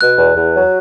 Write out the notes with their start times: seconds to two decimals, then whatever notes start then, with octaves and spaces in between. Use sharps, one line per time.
0.01 B2 F#6
0.18 E2
0.36 E2
0.55 F#3